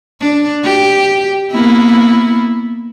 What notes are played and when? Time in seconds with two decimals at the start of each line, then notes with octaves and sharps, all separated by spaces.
0.21 D4
0.64 G4
1.51 A#3 B3 E4